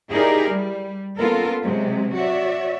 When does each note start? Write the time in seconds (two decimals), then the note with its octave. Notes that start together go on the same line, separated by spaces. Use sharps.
0.10 D#4 E4 G4 G#4 A#4 D5
0.50 G3
1.18 A#3 B3 C#4 F4 A4 A#4
1.64 C3 F#3 G#3
2.16 F#4 C#5 D5 E5